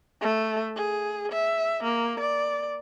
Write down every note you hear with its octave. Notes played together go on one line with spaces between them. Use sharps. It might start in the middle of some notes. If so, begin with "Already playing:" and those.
A3
G#4
E5
A#3
D5